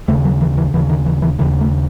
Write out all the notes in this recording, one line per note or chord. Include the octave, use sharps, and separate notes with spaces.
D#2 C#3 A3
F#3
E3
E3
D#2 C#3 E3
D#3
E3
E3
D#2 C#3 E3
A3